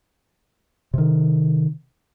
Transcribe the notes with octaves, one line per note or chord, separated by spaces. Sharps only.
C3 D#3